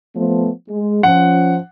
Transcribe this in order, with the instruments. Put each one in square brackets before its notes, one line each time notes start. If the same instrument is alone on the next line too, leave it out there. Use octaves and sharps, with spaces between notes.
[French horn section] F3 A3 B3
G#3
[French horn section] F3 C#4 [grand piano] F#5